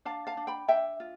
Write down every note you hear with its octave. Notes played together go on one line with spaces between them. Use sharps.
D4 F5 A5
F5 A5
D4
G5 B5
D4 E5 G5
F4